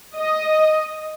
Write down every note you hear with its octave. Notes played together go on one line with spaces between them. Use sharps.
D#5